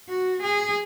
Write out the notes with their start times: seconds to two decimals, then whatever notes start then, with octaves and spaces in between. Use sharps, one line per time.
0.09 F#4
0.42 G#4